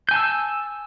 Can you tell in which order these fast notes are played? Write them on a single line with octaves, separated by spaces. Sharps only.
G6 G#5 A5 E6